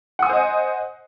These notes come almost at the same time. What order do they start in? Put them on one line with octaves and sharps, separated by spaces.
F#5 D#6 G#5 C5 D#5